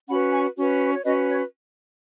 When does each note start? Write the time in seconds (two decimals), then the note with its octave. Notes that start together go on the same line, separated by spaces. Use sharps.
0.08 C#4 F#4 B4 F#5 B5
0.33 G#5 C#6
0.57 C#4 F#4 B4
0.94 C#5
1.04 C#4 F#4 B4 D#5
1.28 C#5